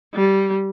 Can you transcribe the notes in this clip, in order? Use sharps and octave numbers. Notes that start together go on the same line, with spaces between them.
G3